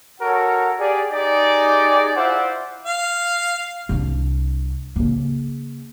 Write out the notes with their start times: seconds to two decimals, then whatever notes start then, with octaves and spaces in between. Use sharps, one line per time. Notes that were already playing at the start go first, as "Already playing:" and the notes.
0.21 F#4 A4 A#4 C#5 F#5
0.79 G4 G#4 D5
1.12 D#4 G4 G#4 D5
2.17 E4 F4 C5 D5 E5 F#5
2.86 F5
3.89 C2 D4
4.96 C#3 A#3